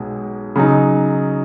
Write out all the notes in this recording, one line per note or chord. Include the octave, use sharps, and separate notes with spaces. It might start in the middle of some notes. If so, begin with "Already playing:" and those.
Already playing: B1 B2 G#3
C#3 F#3 D#4